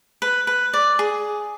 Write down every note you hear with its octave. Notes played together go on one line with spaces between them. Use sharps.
B4
B4
D5
G#4